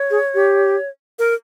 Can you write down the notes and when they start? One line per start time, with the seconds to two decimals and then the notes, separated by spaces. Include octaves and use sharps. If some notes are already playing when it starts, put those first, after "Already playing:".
Already playing: C#5
0.11 G#4
0.35 G4
1.19 A#4